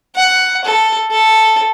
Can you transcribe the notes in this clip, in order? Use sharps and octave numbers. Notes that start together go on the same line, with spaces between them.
F#5
A4
A4